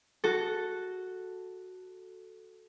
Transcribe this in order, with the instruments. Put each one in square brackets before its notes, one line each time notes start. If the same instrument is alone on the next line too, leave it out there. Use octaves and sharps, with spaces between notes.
[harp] F#4 A4